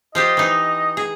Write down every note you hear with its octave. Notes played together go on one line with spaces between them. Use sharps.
F3 F4 G4 D#5
E3 D#4
G#4